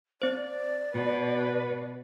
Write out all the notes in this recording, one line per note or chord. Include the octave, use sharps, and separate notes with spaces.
C4 C5 D5
B2 B4